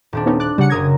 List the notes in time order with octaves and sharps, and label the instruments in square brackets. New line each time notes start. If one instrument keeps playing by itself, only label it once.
[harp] D#1 C4 D4
[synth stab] B3 C#4 D#4
[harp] D5 [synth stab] F#6
[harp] C#3 [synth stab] G3 F#5 C#7
[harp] F#1 A#4 A#6 [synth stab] D#6 G#6